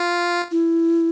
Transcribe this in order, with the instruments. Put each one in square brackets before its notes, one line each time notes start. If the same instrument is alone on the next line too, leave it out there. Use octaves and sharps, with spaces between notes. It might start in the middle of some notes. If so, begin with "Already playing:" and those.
Already playing: [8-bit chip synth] F4
[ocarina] E4